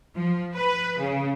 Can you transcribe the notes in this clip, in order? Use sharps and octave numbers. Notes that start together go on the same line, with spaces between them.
F3
B4
C#3